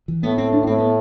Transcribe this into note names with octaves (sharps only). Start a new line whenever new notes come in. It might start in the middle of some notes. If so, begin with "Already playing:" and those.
E3
A2 B3
C4
D4
D4
A2 C4
B3